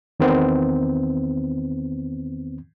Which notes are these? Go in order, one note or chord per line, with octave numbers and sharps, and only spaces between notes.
E2 D#3 B3 C4